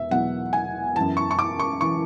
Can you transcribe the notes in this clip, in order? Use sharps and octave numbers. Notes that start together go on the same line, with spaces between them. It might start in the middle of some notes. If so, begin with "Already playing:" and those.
Already playing: E2 B2 E5
E2 B2 F#3 F#5
G#5
F#2 E3 A5
C#6
C#6
D6
C#6
E3 C#6